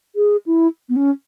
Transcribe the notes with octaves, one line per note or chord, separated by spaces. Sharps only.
G#4
E4
B3
C#4